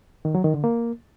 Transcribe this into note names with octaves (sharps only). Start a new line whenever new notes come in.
D#3
F#3
D#3
D3
A#3